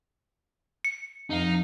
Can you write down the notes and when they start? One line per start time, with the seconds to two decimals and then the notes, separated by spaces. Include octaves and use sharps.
0.85 C#7
1.30 F2 D#4 F5